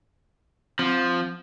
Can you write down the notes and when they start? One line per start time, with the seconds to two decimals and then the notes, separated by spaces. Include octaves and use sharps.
0.79 F3 C4